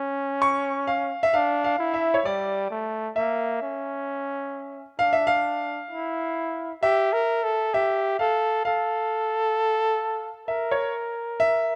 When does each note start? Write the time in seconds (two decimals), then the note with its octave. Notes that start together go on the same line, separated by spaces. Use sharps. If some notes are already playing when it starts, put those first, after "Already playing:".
Already playing: C#4
0.42 C#6
0.87 F5
1.23 E5
1.34 D4 F5
1.64 F5
1.79 E4
1.94 E5
2.14 C#5
2.25 G3 D5
2.70 A3
3.16 A#3 E5
3.62 C#4
4.99 D4 F5
5.13 E5
5.27 F5
5.91 E4
6.82 G4 E5
7.13 A#4
7.44 A4
7.74 G4 E5
8.19 A4 F5
8.65 A4 F5
10.48 A#4 E5
10.71 C#5
11.40 E5